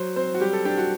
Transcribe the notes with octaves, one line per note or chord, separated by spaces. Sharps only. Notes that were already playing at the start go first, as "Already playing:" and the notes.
Already playing: F#3 C5
C4 C5
F#4
G3 G4
A4
D4 G4
F#4